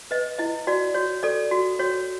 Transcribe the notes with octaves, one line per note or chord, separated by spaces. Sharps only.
B4 D#5
E4 D#5
F#4 D5
F#4 C#5
A4 D5
F#4
F#4 C#5